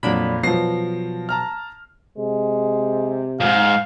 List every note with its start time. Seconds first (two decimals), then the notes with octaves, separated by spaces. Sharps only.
0.03 F2 A#2 F#3 D4 B5
0.43 B2 F3 F#3 A#6 C7
1.29 A5 A#5 F6
2.18 C3 G#3
3.40 F2 G#2 F5